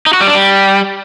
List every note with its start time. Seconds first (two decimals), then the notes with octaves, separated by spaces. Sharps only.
0.06 D#4
0.13 F#4
0.20 G3
0.27 D4
0.34 G3